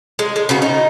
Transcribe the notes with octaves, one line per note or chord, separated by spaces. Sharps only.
G#3
G#3
C#3 B3 F#4
D#4